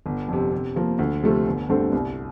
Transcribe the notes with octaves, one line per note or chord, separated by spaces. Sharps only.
G1
F2 C3
C3
F3 A#3
D2
C3 F3 A3
G1
G2 D3 A3 C4
C2